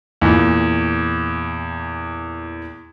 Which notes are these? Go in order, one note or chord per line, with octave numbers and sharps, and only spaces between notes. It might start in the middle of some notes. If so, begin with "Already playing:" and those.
E2 A#2